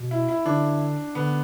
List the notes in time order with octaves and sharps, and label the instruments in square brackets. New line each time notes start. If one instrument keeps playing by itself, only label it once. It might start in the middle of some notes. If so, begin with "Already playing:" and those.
Already playing: [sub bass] B2
[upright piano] E4
E4
[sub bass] D3 [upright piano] D4
[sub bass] D3 [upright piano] B3